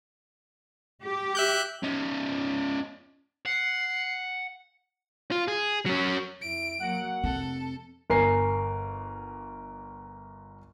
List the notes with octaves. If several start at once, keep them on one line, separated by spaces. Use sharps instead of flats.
G4
E5 F#6 G6
C#4 D#4
F#5 C7
F4
G#4
F#3 C#4
F2 E4 D7
F#3 A#3 F#5
F1 C4 A4
G1 A#4 G#5 C7